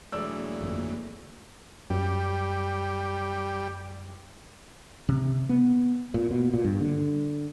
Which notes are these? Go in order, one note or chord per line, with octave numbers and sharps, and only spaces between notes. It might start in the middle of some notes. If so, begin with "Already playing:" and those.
E1 E3 F#3 A3 D5 E6
A#3
G1 F2
F#2 G3
C3
B3
A#2
B2
A#2
G2
D3